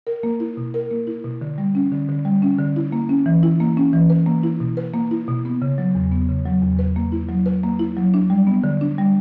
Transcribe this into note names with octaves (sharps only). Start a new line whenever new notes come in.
A#4
A#3
E4
B2
A#4
A#3
E4
B2
D3
G3
C#4
D3
D3
G3
C#4
D3
E4
A#3
C#4
E3
E4
A#3
C#4
E3
B4
A#3
E4
B2
B4
A#3
E4
B2
B3
C#3
F#3
E2
B3
C#3
F#3
E2
B4
A#3
E4
F#3
B4
A#3
E4
F#3
D4
G3
B3
D3
D4
G3